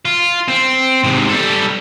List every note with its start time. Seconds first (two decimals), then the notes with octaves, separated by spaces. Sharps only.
0.05 F4
0.48 C4
1.04 G#2 C3
1.29 G3 A4